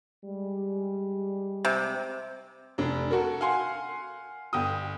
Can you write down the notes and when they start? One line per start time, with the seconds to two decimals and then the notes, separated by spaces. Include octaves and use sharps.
0.24 G3 G#3
1.65 C3
2.78 F1 D4
3.11 F#4 A4 A#4
3.41 F5 F#5 G#5 C6
4.53 G1 G5 D#6